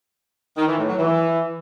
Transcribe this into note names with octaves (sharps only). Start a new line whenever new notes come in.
D#3
E3
A2
F#3
E3